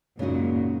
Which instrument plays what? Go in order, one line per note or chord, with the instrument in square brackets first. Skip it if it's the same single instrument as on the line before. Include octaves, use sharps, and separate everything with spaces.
[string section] F#2 A#2 [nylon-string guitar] C#3 G#3 D#4 F#4